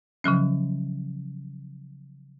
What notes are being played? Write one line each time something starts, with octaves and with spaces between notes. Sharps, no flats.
C#3 F3 F#3 C#4